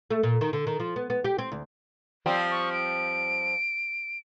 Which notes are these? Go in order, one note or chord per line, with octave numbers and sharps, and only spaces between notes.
A3
A#2
D#3
D3
D#3
F3
B3
B3
G4
C4
D2
F3 G3 C4
C#6
D7